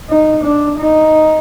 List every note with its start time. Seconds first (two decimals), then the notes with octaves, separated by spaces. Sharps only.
0.09 D#4
0.44 D4
0.79 D#4